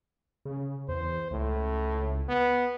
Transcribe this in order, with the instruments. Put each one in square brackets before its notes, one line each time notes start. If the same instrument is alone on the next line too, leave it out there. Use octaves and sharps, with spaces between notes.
[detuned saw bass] C#3
[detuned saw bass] E2 [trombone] C5
[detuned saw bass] C#2 [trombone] A2
[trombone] B3